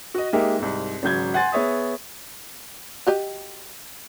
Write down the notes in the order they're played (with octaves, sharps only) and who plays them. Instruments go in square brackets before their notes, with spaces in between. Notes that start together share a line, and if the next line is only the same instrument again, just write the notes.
[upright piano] F#4 D#5
G#3 A#3 D#4 G4 E5
C2 G#2
G#1 C#3 F#3 G6 G#6
F#5 G#5 C6 A6
B3 G#4 C#5 E5 D#6
[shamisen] F#4 G4 D#5